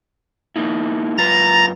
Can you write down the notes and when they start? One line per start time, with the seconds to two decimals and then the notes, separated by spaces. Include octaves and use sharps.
0.56 A#3 D#4 E4
1.17 F#2 F4 B4 A#5 A6 A#6